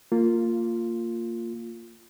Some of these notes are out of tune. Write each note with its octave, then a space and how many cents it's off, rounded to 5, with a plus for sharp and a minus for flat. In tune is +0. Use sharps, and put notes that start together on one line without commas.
A#3 -20 F4 +0